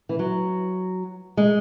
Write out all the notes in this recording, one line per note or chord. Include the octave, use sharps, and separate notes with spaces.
E3
F#3
G#3